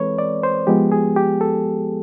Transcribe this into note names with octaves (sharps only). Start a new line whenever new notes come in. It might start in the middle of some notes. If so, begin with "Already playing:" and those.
Already playing: E3 G#3 C4 A4 B4 C#5
D5
C5
F3 G#3 B3 G4
G#4
G4
A4